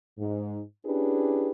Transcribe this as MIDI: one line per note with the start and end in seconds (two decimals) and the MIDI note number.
0.18 0.61 44
0.85 1.50 61
0.85 1.50 62
0.85 1.50 64
0.85 1.50 67
0.85 1.50 68
0.85 1.50 71